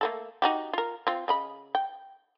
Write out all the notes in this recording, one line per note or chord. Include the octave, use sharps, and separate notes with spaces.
A3 A#3 A4
D#4 F#4 G4
F4 A#4
C4 F4
C#3 D#5 B5
G5